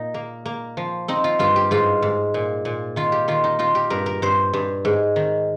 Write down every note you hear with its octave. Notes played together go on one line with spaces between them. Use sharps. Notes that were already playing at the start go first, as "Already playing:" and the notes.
Already playing: A#2 D#4
A#3
A#3
F3
C4 D#4
F4
G2 F4
G4
G#2 F4
G#2
A#2
A#2
D#3 F4
G4
D#3 F4
D#4
D#4 F4
G4
G2 A#4
A#4
G2 C5
G2
G#2
D#3